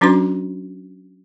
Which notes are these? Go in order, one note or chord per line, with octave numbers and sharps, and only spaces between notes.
F#3 C#4 D4 F#4 B4 C6